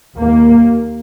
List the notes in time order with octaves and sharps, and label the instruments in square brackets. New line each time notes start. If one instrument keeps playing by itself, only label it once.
[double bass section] D#2 A#3